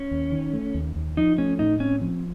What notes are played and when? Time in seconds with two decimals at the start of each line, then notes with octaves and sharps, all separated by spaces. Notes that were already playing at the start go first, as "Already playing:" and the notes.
Already playing: C#4
0.11 D#2
0.32 D#3
0.53 A3
0.74 D#2
0.96 D#2
1.17 F3 D#4
1.38 A3 C#4
1.59 A2 D#4
1.80 C4 C#4
2.01 F3